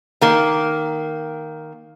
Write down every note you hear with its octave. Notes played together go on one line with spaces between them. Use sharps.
D#3 A#3